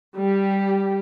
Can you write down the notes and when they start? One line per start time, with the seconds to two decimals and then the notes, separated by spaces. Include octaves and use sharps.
0.16 G3 G4